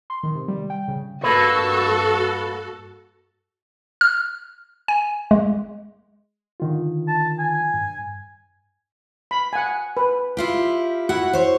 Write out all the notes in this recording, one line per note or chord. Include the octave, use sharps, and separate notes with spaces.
C6
D#3
C3
G3
G5
C#3
G2 A#3 F#4 A4 B4 C#6 E6
F6
G#5
G#3
D3 D#3 F4
A5
G#5
G2
B5
F#5 G#5
B4
E4 F4 G4
E4 F#4 F#5
C5 C#5